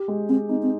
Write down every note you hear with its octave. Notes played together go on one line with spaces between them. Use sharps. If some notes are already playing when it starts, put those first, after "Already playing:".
Already playing: G4
G#3
G#3 C4
C4 D#4
C4